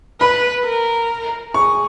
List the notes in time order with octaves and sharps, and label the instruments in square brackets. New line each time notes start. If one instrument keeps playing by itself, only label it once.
[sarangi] B4 [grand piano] B5
[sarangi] A#4
[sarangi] G#4 [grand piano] C#6